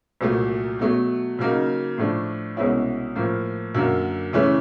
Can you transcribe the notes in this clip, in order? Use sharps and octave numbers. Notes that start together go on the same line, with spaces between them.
C2 A#2 F#3 A3
B2 F#3 A3
C#3 F#3 A#3 D#4
A2 F3 A3 D4
C2 B2 G#3 C#4 E4
A2 F3 A#3
F#2 D3 F#3 A#3
C#3 E3 A3 C#4 E4